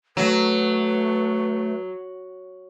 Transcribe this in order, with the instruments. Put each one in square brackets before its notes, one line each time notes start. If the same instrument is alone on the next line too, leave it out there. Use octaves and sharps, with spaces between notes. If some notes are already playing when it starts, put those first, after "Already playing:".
[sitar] F#3 [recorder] A3 [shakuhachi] B4